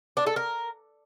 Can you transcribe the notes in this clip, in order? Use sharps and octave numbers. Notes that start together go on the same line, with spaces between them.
D4
A4
A#4